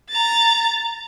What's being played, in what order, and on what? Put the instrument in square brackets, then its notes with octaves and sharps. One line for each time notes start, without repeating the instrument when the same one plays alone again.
[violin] A#5 A6